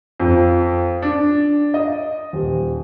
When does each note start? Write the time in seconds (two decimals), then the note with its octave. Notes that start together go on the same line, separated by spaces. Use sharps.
0.20 F2
1.02 D4
1.74 D#5
2.33 D#1